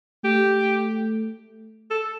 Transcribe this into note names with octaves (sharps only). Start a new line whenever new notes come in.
A3 G4
A4